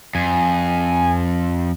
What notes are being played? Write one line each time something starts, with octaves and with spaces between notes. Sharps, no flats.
F2 G#5